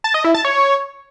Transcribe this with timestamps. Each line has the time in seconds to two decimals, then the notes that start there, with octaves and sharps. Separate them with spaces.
0.04 A5
0.14 D#5
0.24 E4
0.34 A5
0.45 C#5